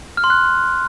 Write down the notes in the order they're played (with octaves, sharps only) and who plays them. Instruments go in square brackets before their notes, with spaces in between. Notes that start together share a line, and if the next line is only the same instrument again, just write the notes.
[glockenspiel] F6
C6
F#6